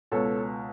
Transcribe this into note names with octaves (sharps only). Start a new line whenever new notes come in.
C#2 B2 A4 C#5